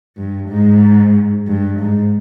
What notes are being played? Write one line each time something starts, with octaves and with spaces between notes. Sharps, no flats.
G2
G#2
G2
G#2